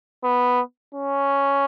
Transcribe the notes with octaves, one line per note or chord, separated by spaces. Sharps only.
B3
C#4